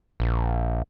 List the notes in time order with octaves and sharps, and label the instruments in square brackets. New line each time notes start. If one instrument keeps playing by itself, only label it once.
[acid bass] A#1